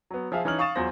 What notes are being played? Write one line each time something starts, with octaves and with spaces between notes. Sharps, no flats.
F#3 B3
F3 G#4 E5 F5
E3 C#4 D#4 C#5 F6 F#7
F5 C#6 D#6 A6 E7
E2 F#3 F4 C5 A#6